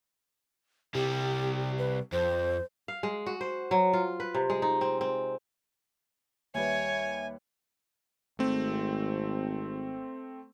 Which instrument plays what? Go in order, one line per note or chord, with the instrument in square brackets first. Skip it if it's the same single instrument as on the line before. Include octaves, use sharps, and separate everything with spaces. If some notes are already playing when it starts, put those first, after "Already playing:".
[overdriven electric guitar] C3 G3 [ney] G4
[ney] B4
[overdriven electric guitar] F2 [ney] C5
[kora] F5
G#3
F#4
C5
F#3
F4
B4
C3
G#3
D#4
C4
C4
[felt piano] D#2 G3 B4 [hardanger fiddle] C#5 [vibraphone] E5 [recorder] G#5
[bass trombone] G#1 [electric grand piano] A3 C4